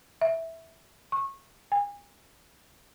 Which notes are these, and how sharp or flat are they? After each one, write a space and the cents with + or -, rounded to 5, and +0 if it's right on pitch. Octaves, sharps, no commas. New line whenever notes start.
E5 -10
C#6 -25
G#5 -35